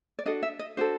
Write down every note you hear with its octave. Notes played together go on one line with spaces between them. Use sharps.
D5
D4 F#4 A4 D#5
E5
D#5
D4 F#4 A4 C5